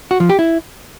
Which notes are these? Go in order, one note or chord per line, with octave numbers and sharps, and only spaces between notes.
F#4
F3
G4
E4